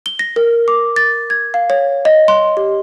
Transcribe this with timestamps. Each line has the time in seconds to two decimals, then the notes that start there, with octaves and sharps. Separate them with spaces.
0.06 G7
0.19 A#6
0.36 A#4
0.68 D6
0.96 A6
1.30 G#6
1.54 F5
1.70 C#5
2.05 D#5
2.28 C6
2.57 G4